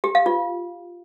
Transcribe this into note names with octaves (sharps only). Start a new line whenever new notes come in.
G4
F5
F4